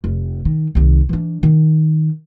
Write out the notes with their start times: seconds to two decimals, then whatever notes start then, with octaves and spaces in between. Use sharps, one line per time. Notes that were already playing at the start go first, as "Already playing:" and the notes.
0.04 F1
0.45 D#3
0.75 C2 D#3
1.09 E3 D4
1.43 D#3